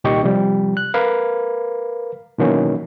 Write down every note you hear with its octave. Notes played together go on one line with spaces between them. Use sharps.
C2 A#2 D#3 G4 D#5 C#6
C3 F3 G3
F#6
A#4 B4 F5
B2 D#3 E3 F#3 A#3 C#4